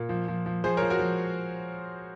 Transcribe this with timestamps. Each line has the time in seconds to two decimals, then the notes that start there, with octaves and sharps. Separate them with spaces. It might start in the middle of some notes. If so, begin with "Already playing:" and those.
Already playing: A#2
0.09 F3
0.28 F3
0.46 F3
0.64 F3 G#4 C5
0.77 A#4 C#5
0.82 F3
0.90 F#4 A#4
0.99 F3